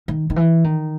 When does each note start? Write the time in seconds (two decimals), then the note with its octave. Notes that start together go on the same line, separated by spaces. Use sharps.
0.08 D#3
0.30 D#3
0.36 E3
0.64 D#3